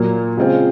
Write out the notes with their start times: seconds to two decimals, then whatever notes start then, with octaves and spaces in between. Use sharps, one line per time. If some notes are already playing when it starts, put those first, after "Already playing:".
Already playing: A#2 F#3 A#3
0.37 C#3 G#3 C4 F4